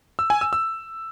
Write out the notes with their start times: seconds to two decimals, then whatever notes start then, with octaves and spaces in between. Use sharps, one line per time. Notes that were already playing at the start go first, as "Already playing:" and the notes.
0.19 E6
0.30 G#5
0.41 E6
0.53 E6